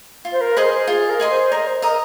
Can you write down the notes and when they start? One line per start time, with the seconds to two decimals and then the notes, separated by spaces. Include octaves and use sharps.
0.25 F4
0.32 C5
0.41 A#4
0.57 G#4 C5 D#5 C6
0.73 C5
0.87 F4 G#4
1.09 A#4
1.20 G#4 D#5 C6
1.30 C5
1.52 A#4 D#5
1.67 C5
1.82 A#4 D#5 A#5 D#6